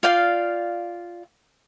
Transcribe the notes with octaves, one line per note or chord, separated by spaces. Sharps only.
F4 D5 F5 G5